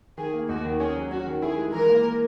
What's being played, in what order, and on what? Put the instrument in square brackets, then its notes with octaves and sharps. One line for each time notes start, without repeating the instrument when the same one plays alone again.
[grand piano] D#3 [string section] G#4
[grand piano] A#3
[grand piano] D#2 [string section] F#4
[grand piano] D#3
[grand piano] C#4 [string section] G#4
[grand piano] F#3
[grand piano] C#4 [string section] F#4
[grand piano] D#3
[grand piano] E4 [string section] G#4
[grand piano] G#3
[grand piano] E3 [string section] A#4
[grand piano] A#3